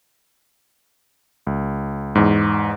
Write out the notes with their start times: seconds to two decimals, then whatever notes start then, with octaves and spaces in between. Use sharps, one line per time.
1.47 C#2
2.15 E2 G#2